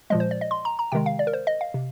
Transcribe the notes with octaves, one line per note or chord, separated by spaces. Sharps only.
A#2 F3 G#3 D#5
C5
D5
D#5
C6
A#5
A#5
C3 D#3 G#3 G5
F5
D5
A#4
C5
D#5
F5
C3